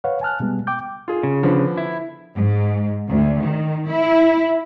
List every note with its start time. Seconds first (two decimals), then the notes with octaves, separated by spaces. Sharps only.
0.04 B4 C#5 F5 F#5
0.21 G#5 A5 F6 F#6
0.40 B2 G3 G#3 B3
0.67 G5 D6 G6
1.08 F4 G#4
1.23 C#3
1.43 D3 F3 B3
1.77 E4
2.34 G#2
3.09 D2
3.43 D#3
3.89 E4